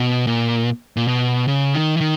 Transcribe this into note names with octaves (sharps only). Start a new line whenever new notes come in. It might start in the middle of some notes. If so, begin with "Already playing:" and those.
Already playing: B2
A#2
A#2
B2
C#3
D#3
E3
D#3